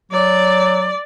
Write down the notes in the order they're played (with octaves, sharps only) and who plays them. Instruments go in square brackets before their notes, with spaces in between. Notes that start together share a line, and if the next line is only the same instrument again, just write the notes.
[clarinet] F#3 [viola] D5